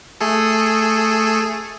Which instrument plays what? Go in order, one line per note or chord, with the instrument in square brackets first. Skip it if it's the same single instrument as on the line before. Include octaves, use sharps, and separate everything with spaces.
[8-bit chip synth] A3 G#4 A4